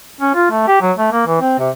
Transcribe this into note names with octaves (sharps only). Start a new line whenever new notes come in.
C#4
F4
A3
G4
F#3
A3
A#3
E3
C4
C3